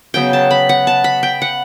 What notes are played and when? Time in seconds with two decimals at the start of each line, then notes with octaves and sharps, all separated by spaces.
0.14 C#3 F#3 B3 G5
0.33 A5
0.51 B5
0.69 F#5
0.87 A5
1.04 B5
1.23 G5
1.42 F#5